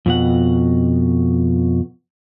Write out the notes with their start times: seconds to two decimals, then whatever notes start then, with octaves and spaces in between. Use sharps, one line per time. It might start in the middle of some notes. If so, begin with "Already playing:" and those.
0.06 F2 B2 F#5